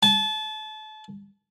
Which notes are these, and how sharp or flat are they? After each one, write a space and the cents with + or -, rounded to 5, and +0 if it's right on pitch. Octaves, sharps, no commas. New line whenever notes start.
A5 -30